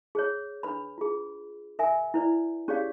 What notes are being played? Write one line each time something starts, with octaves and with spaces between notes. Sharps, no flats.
G#4 C5 C#5
D4 B4 B5
F4 G#4
A#4 E5 G#5
E4 B4 D5
C#4 G4 G#4 C#5 D5 F5